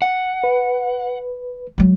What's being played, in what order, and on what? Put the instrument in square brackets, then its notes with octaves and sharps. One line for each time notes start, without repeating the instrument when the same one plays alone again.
[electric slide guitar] F#5
[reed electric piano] B4
[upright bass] F#3 G#3